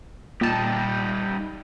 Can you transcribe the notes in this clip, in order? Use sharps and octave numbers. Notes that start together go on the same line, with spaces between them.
A#2 G3 D#4 G4 A5